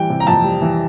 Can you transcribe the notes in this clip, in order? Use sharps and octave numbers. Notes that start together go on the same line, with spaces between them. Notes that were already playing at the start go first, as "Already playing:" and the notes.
Already playing: E3 G3 G5
C3
A#5
F2 A5
G3
E3